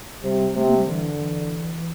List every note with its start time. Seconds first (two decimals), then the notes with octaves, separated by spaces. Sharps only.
0.23 C3 G3
0.55 C3 A3
0.66 A#3
0.76 G3
0.87 D3 E3
1.18 E3